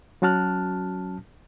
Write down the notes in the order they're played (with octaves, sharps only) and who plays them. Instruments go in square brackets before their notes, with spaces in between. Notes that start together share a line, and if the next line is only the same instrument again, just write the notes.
[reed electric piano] F#3 C#4 F#4 A5 F6 F#6